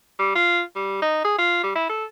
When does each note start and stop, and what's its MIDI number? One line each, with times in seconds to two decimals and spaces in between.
0.19 0.35 55
0.35 0.61 65
0.76 0.98 55
1.02 1.20 63
1.25 1.36 68
1.38 1.59 65
1.63 1.75 55
1.76 1.89 64
1.89 2.05 69